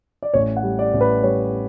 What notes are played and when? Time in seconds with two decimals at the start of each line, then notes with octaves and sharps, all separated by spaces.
0.23 D5
0.34 A1 C#5
0.57 F#5
0.63 G3
0.79 D5
0.94 A1
1.01 B4
1.23 G3 C#5